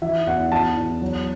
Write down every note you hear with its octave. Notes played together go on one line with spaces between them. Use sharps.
E3 E5
E2 F#5
E2 A5
E2
F#3